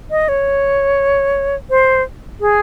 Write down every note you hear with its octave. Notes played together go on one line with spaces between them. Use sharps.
D#5
C#5
C5
G#4